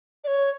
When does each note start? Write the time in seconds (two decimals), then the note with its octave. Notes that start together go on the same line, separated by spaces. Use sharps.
0.24 D5
0.27 C#5